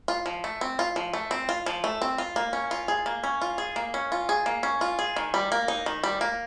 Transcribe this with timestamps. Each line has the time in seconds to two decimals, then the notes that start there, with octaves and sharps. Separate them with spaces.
0.08 F4
0.26 F3
0.44 A3
0.61 C4
0.79 F4
0.96 F3
1.13 A3
1.31 C4
1.49 F4
1.66 F3
1.84 A3
2.02 C4
2.18 F4
2.36 A#3
2.53 C#4
2.71 F4
2.88 G#4
3.06 A#3
3.24 C#4
3.42 F4
3.58 G#4
3.76 A#3
3.94 C#4
4.12 F4
4.29 G#4
4.46 A#3
4.63 C#4
4.81 F4
4.99 G#4
5.16 D#3
5.34 G3
5.52 A#3
5.68 D#4
5.86 D#3
6.04 G3
6.21 A#3